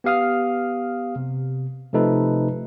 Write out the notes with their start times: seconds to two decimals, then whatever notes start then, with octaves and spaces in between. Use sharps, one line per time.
0.04 B3 G4 F5 D#6 F6
1.16 C3
1.93 C3 F3 A3 D#4 A4 B4